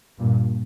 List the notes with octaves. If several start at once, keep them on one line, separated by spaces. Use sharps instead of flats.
G2 A#2